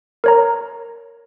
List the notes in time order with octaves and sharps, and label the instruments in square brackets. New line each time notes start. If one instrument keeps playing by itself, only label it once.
[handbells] A#4 C#5 A#5